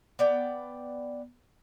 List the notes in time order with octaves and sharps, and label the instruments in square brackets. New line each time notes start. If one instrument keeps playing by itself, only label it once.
[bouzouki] B3 D5 G5